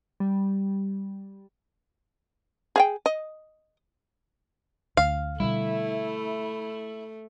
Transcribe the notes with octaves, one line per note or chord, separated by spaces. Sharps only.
G3
G#4 F5 G5
D#5
D2 F5
B2 D3 G3 A3 E4